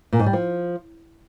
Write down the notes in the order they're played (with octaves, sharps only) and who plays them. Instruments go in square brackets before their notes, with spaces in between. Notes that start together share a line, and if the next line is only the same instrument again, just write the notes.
[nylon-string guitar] A#2
G#2
G3
F3